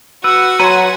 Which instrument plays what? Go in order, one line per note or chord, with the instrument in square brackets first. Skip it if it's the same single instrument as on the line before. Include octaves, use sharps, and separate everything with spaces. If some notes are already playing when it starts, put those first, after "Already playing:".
[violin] F#4 F#5 [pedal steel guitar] B4 [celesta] E6
[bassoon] F#3 [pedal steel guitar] B4 G#5 [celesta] A#5 C6